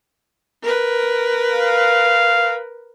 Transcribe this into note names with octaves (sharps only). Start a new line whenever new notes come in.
A#4 B4
F5